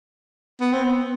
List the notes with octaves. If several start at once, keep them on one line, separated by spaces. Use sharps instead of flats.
B3
C4
B3